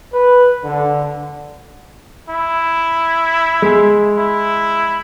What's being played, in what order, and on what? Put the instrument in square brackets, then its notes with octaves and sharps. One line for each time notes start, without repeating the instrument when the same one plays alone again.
[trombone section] B4
D3
[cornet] E4
[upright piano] G#3
[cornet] E4